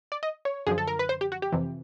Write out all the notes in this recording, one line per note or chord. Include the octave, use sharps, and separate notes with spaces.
D5
D#5
C#5
F#2 D3 F3 G#4
A4
A#4
B4
C5
G4
F#4
G4
F2 C3 E3